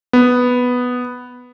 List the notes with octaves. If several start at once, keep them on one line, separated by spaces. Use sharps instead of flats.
B3